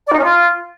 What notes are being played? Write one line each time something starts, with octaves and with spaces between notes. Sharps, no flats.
D5
D#4
C#4
F4